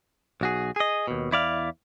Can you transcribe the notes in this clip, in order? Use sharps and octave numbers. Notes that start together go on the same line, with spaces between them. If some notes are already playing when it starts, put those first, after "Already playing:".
B1 F#4 G#4
G#4 D#5
D#2 B2
E2 E4 D5 F5